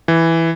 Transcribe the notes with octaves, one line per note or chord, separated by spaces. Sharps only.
E3